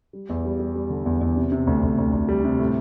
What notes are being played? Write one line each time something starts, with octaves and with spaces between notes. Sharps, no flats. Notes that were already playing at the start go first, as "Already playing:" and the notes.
G3
E2
G3
G3
G3
D3
E2
E2
C3
C3
D2
D2
D2
D2
G3
C3
A2